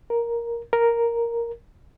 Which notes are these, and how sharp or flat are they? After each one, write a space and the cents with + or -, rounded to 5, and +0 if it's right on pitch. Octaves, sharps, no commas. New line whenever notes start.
A#4 +5
A#4 +0